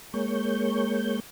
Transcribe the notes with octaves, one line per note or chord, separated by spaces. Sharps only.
G#3 A#3 C#5 G6